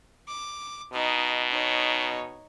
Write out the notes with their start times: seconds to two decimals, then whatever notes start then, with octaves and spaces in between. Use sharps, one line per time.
0.28 D6
0.93 B2 D#4 D#5
1.51 D#4 C#5